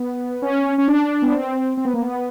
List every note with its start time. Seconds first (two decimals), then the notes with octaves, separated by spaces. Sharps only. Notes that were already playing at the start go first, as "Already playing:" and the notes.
Already playing: B3
0.42 C#4
0.78 C#4
0.88 D4
1.22 B3
1.32 C4
1.77 C4
1.85 B3
1.94 A#3
2.02 B3